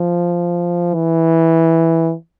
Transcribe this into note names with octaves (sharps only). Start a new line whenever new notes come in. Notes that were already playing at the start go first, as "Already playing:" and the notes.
Already playing: F3
E3